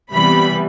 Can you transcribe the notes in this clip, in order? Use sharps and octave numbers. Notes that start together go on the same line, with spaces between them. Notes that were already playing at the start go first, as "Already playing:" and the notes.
C3 E3 G3 B3 B5